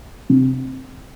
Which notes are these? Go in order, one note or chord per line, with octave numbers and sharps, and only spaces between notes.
C3